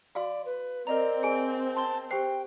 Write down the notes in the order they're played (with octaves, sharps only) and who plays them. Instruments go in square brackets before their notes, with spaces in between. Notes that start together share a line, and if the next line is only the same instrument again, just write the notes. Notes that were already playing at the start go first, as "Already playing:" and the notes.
[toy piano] F#4 F5 C6 [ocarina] D5
[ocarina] B4
[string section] C4 [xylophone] A#4 D#5 A#5 [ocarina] D5
[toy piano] G#4 G#5
[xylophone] G5 C6 G7 [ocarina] A5
[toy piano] G4 C5 [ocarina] G5 [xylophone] C7